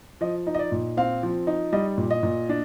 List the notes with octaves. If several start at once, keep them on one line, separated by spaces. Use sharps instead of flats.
F3 D#5
D#4
D#5
D5
A#2
C4 F5
F3
D#4
G3 D#5
A#2
D#5
A#2
D4